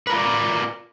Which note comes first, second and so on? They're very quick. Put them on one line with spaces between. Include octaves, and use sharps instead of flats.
B4 A#4 F4 D5